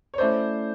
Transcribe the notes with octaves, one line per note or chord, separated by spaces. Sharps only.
C#5
A3 C#4 E4 A4 C5 D5